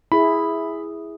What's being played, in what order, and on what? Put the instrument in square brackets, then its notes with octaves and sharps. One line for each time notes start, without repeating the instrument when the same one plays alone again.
[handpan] E4 G#4 [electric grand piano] B5